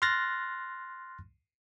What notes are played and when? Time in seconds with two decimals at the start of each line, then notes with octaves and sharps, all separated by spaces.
0.02 C6 F6 F#6 A6 A#6